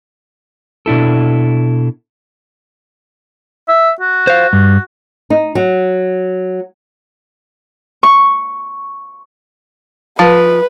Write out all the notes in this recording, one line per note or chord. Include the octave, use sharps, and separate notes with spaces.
B2 D4 E4 A4
E5
F#4
C5 F5
G2
D#4
F#3
C#6
F3 B4